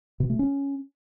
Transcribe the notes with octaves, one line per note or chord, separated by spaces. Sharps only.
B2
A3
C#4